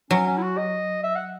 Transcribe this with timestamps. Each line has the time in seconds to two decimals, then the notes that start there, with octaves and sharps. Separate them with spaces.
0.11 F#3 C#4
0.27 C#4
0.38 E4
0.42 F#4
0.57 D#5
1.03 E5
1.16 F#5